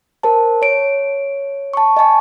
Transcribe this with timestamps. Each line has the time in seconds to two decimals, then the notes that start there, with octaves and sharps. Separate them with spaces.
0.23 A#4 C5 A5
0.62 C#5 D7
1.74 A5 C#6
1.97 D#5 G#5 A5 C#6